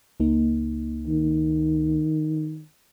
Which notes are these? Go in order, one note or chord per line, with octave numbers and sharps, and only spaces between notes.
C#2 A#3 D#4
D#3